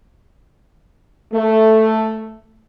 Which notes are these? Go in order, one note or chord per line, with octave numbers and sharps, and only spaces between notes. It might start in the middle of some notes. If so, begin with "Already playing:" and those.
A3